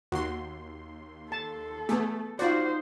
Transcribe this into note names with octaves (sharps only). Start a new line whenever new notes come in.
D#2 F#4 C6
A4 A5
A3 B3 G#4
D#4 F4 F#4 C5 D5